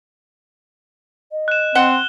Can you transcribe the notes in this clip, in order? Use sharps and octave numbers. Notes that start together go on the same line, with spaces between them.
D#5
F#6 E7
C4 F#5 G7